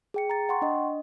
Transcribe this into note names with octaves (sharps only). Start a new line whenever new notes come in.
G#4 G5 C#7
A#5 A6
F#5 G5 C6 C#6
D4 D#5